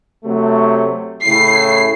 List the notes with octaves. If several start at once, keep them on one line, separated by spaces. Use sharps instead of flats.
C3 F#3 A3
A2 C#3 E4 C7